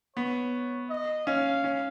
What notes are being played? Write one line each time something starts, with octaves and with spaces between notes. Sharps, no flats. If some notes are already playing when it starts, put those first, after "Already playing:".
B3 C#5
D#5
C#4 F5
C#4